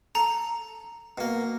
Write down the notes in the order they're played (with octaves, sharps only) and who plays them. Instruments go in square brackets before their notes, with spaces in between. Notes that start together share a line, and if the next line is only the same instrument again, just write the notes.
[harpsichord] A4 [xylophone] A#5
[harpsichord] B2 A#3